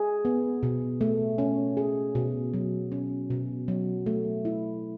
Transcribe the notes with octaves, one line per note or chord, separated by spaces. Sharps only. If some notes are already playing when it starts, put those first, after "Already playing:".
Already playing: G#4
B3
B2
A3
C#4
G#4
B2
F#3
C#4
B2
F#3
A3
E4